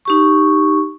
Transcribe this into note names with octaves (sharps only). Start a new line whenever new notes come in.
D#4 G4 C#6